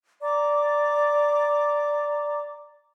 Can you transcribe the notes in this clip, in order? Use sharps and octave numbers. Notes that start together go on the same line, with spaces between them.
D5 A#5 D6